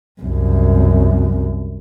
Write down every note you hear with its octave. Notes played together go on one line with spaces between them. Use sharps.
C2 F#2